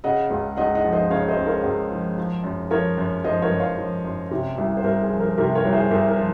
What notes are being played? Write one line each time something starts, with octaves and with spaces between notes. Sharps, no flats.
C#3 D#5 F#5
C#2
C#2 D#5 F#5
D#5 F#5
F3
C5 D#5
C#3 C#5 F5
C5 D#5
C#2
A#4 C#5
C#2
F3
F3
F#2
F3 A#4 C#5
F#2
F3 C5 D#5
A#4 C#5
F#2
C#5 F5
F3
F#2
C3
C2
C5
C2 A#4
G#4
F3
A#4
C3 A#4
A#4 C#5
C2
G#4 C5
C2 A#4
A#4
F3